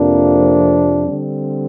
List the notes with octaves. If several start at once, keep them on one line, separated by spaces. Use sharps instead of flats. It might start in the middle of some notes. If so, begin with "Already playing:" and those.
Already playing: F2 C3 F3 A#3 D4
D3 G3 C4